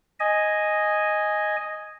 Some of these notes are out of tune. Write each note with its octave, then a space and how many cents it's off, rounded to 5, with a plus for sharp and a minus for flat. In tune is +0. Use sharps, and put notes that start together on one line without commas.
D#5 +0 G#5 +0